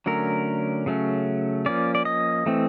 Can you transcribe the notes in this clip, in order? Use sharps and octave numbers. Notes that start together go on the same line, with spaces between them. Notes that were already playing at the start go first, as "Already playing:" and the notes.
D3 F#3 A3 C#4 A#4
C#3 F#3 A3 C#4
F3 A#3 C#4 D5
D5
D#5
E3 A3 C4